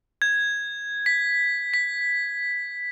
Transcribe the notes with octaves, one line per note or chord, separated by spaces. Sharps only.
G#6
B6
B6